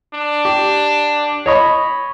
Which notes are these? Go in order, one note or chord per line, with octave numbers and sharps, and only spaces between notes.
D4
G4
C#5 D#5 B5